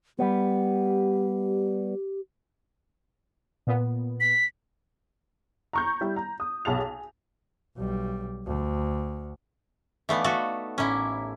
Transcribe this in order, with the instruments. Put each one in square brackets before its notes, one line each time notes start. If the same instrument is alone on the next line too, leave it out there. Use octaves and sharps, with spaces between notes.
[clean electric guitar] G3 B3 [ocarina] G4
[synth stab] A#2 B3
[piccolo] B6
[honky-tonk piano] A#5 C#6 G6
G3 E4
A#5
D#6
B1 G#4 A5 F7
G#4
[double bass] B1 G3
D2
[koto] E3 A3 B3 [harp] D#4 D5 F5
[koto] A3 F#4 A4
[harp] A1 A#4 D6 [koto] C#4 E4